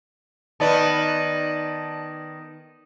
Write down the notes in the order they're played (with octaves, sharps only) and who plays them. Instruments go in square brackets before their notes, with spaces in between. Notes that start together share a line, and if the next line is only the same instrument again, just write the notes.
[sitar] D#3 B3 [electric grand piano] D5 A5